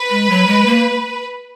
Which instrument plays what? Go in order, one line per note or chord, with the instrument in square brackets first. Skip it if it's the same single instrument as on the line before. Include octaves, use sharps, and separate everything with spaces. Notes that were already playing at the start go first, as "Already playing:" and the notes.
Already playing: [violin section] B4
[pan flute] G#3
F#3
G#3
A#3